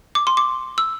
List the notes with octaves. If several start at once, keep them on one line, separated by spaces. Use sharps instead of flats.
D6
C6
D6
E6